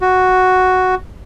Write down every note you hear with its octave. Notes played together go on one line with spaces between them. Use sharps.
F#4